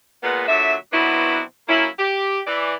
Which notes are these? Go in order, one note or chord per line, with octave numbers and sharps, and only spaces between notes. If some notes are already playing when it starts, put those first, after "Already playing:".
A#2 G#3 B3
A#2 D3 F#3 E5
B2 F#3 B3 C4 D4 E4
F#3 A#3 C#4 E4
G4
E3 D5